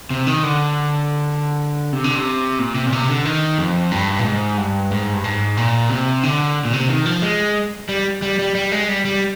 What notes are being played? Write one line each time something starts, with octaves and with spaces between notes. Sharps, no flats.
C3
D#3
D3
C3
D3
C3
A#2
C3
A#2
C3
D3
D#3
F2
G2
A#2
G#2
G2
G#2
G2
G#2
A#2
C3
D3
A#2
C3
D#3
F3
G#3
G3
G3
G3
G3
G#3
G3
G3